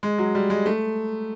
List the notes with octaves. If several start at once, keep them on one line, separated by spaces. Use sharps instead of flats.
G#3
F#3
G3
G#3
A3